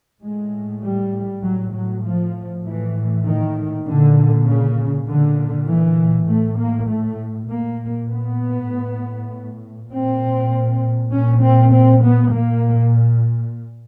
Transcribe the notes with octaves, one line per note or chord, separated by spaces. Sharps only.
A2 G#3
G3
A2 F#3
F#3
F3
A2 E3
D#3
A#2 D3
C#3
A#2 D3
E3
A2 A3
A#3
A3
A#2 A#3
B3
A2
A#2 C4
A#2 C#4
C4
C4
B3
A#2 A#3